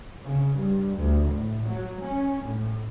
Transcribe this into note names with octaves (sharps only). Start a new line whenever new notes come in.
C#3
G2
D2
A2
F#3
C#4
A2